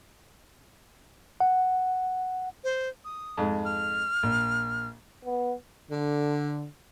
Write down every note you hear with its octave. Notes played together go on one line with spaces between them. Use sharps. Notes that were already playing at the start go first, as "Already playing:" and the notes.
F#5
C5
D#6
F2 G#2
F6
A#1
B3
D3